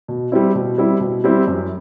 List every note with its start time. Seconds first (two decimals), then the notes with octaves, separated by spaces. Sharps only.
0.08 B2
0.32 G3 C4 E4
0.55 B2
0.78 G3 C4 E4
1.00 B2
1.24 G3 C4 E4
1.47 F#2